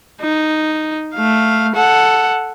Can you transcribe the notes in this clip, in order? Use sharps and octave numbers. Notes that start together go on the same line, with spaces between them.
D#4
A3 F5
A4 F#5